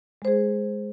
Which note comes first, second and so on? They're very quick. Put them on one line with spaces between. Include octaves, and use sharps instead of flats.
G#3 C5 G#4